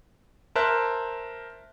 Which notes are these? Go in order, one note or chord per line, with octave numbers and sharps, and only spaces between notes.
A#4 C5 E5 A5 F#6